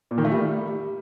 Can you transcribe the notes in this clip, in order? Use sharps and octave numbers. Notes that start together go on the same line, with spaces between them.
A#2
D#3
A3
G3